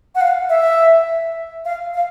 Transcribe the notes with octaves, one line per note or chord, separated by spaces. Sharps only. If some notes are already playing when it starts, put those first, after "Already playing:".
F#5
F5
E5
F5
F5